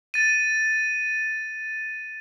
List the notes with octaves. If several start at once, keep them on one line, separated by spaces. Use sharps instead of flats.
A6 D#7